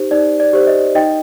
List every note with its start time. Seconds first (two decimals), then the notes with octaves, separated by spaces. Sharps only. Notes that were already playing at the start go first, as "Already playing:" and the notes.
Already playing: D#4 G4 C5
0.11 D#4 D5
0.40 D5
0.53 G4 C5
0.67 D#5
0.95 D#4 D#5 G5